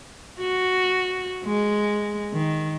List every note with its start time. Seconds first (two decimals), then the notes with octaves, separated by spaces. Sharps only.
0.40 F#4
1.45 G#3
2.33 D#3